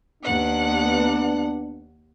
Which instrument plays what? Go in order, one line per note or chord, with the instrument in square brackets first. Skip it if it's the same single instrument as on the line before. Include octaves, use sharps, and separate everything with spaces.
[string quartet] D#2 F#5 F#6 [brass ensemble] B3 D4